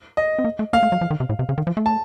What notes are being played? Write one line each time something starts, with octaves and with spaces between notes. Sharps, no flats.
D#5
C4
A#3
A3
A#3 F5
A3
F#3
F3
D#3
C3
A2
C3
C#3
D#3
F3
A3
A5